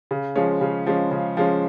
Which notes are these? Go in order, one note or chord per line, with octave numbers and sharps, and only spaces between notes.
C#3
F3 G#3 C#4
C#3
F3 G#3 C#4
C#3
F3 G#3 C#4